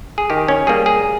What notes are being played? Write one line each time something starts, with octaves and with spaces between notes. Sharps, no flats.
G#4
D#3 G4
C#4
G3 A#3 G#4
G#4